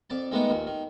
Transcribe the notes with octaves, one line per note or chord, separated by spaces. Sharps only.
F2 D5 A5
D#3 G#3 A3 B3 D4 D#4
D#2 A#2
D#3